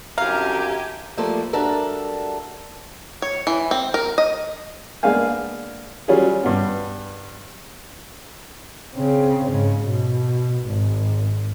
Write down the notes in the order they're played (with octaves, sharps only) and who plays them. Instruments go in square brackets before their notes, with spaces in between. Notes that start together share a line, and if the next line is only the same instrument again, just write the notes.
[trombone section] C2 F#2 D3 [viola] G4 G#5 [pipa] F5 [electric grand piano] A#5
[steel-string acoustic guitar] F3 G3 A3 A#3 F4 A4
G3 D4 F#4 A4 A#4 E5
[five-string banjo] C#5
E3
C4
A#4
D#5
[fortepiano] G#3 A#3 B3 D4 F5 G#5
F#3 G3 C#4 F4 G#4
G2 B3
[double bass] C#3 C4
G#2 C#3
B2
G#1